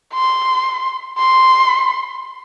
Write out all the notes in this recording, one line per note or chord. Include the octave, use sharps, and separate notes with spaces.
C6
C6